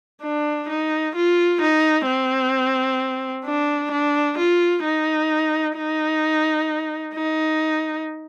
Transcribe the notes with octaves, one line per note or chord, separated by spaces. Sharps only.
D4
D#4
F4
D#4
C4
D4
D4
F4
D#4
D#4
D#4